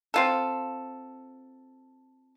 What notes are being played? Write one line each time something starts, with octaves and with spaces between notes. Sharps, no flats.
C4 F4 A4